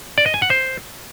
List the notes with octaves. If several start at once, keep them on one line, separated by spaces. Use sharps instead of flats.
D5
D#5
G#5
F#5
C5